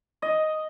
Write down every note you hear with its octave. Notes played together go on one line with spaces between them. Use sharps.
D#5